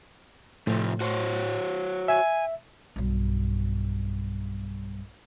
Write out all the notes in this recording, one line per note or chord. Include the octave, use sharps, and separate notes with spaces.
A2 C3 F3
F#4 C5 C#5
E5 G#5
B1 G2